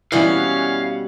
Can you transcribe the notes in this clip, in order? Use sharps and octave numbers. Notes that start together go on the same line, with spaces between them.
B2 E3 G3 C#4 F#4 F5 F#5